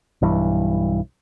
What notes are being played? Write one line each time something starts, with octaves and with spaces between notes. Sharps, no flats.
B1 G2 E3